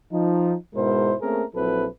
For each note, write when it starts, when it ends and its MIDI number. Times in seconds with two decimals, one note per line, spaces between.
0.12 0.54 53
0.12 0.54 63
0.74 1.14 44
0.74 1.14 47
0.74 1.14 56
0.74 1.14 64
0.74 1.14 70
0.74 1.14 72
1.21 1.43 57
1.21 1.43 58
1.21 1.43 60
1.21 1.43 61
1.21 1.43 68
1.21 1.43 70
1.54 1.86 34
1.54 1.86 54
1.54 1.86 60
1.54 1.86 64
1.54 1.86 69
1.54 1.86 71